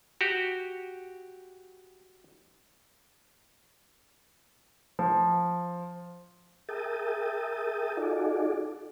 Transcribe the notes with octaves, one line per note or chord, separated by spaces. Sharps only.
F#4 G4
F3
G#4 A#4 E5 G5 A5 D#6
D#4 F4 F#4 G#4 A4 D5